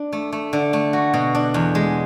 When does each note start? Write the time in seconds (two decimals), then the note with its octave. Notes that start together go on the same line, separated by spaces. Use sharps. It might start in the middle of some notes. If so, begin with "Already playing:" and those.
Already playing: D4
0.13 A3
0.33 A3
0.53 D3
0.73 A3
0.93 F#4
1.14 B2
1.35 D4
1.54 E2
1.75 G#3